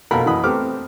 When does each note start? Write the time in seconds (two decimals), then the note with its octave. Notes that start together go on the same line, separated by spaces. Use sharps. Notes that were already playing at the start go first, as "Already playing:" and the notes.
0.11 A#1 B2 F4 A4 A#4 B5
0.26 F#2 E3 D#5 B5 D#6
0.44 A3 B3 C4 G4 D6 F6